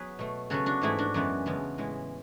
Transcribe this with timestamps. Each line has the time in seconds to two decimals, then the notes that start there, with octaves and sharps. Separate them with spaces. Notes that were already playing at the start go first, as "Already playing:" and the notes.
Already playing: F#3 B3 G#4 B4
0.19 B2 A3
0.50 C#3 F#3 B3 F#4 A4
0.66 D4 F#4
0.81 G#2 E3 A3 E4 G#4
0.98 D4 F#4
1.14 F#2 E3 G#3 B3
1.46 E2 C#3 G#3 B3
1.78 A2 E3 G#3